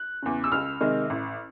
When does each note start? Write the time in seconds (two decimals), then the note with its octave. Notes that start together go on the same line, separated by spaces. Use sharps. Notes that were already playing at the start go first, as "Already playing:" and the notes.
Already playing: F#6
0.22 E2 C#3
0.44 E6
0.52 C#2 F6
0.81 C3 D#3 G#3
1.10 A1